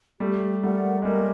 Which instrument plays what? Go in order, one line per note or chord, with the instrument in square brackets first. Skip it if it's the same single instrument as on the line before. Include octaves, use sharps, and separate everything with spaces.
[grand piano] G3 A3 [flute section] G4
[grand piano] G3 A3 [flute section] A#4 D5 F#5
[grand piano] G#3
[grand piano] G3 A3 [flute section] A#4
[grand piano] A#3